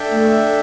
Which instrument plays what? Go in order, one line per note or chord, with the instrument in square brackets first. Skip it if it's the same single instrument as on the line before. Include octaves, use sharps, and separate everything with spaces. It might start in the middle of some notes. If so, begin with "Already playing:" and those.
Already playing: [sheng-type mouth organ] D4 A4 E5 G5
[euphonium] A3